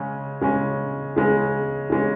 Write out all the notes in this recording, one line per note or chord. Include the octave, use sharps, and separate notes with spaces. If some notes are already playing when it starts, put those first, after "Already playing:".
Already playing: C#3 G#3 C#4
C#3 G#3 C#4
C#3 G#3 C#4
C#3 G#3 C#4